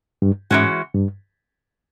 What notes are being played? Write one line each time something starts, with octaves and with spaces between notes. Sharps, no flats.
G2
G#2 E3 G#3 C#4 F#4
G2